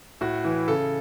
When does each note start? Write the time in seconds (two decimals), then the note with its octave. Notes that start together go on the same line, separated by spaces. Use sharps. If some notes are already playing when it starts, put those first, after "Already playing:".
0.21 A2 F#4
0.44 E3
0.68 C#3 A4